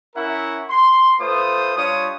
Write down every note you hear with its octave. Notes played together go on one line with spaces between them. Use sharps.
C#4 E4 A#4 E5 F#5
C6
A3 F4 B4 C5 D#6
G3 D4 F4 C#5 D#6